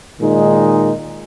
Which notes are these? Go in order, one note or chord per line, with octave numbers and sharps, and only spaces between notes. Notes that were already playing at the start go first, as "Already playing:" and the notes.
A#2 D#3 G#3 D#4